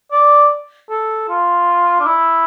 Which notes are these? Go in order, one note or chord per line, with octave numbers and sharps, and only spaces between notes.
D5
A4
F4
D4
E4